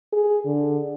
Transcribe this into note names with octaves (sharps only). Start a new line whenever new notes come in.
G#4
D3